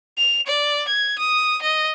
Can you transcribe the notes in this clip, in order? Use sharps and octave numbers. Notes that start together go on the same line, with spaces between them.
F7
D5
G#6
D#6
D#5